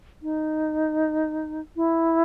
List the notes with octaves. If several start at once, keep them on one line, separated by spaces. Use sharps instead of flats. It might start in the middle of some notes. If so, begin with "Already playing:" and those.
D#4
E4